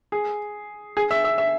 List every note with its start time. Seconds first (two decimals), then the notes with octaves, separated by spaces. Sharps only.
0.12 G#4
0.97 G#4
1.11 E5
1.24 E5
1.38 E5